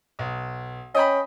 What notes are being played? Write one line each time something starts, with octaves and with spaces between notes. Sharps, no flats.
B1
C#4 D#5 G5 B5